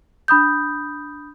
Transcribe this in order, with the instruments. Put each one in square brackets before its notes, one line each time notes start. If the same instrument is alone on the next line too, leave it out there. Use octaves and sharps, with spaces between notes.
[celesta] D4 B5 D#6 G6